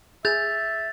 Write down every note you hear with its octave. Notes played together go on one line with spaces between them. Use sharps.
G#4 E5 G6 A6 F7